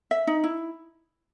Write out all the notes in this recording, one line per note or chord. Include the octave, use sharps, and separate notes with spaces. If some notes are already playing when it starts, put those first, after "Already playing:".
E5
D#4
E4